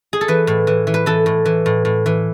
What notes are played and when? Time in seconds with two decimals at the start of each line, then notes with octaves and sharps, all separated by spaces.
0.13 G#4
0.21 A4
0.28 E3 B4
0.47 A2
0.67 E3
0.87 E3
0.94 B4
1.06 E3 A4
1.26 A2
1.45 E3
1.66 A2
1.85 A2
2.06 E3